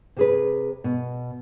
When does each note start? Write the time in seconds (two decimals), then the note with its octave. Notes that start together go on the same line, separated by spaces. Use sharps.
0.16 C3 G#4 B4
0.84 B2